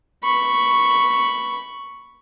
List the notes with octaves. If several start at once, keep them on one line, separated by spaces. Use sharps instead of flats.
B5 C#6